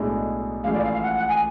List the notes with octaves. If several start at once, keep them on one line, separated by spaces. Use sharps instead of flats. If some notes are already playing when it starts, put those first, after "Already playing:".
Already playing: B1 A2 G#3 D4
A1 A2 F3 G#3 F5
D5
F5
F5
F#5
F#5
G#5